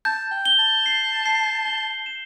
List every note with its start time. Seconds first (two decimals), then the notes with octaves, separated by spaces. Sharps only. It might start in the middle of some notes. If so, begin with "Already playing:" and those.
0.05 A5 G6
0.31 G5
0.45 G7
0.59 A5
0.86 C7
1.26 C7
1.66 G7
2.06 E7